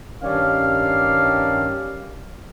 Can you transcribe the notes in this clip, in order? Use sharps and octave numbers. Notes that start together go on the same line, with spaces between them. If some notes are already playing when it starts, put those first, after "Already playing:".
G2 D#3 G3 C#4 F5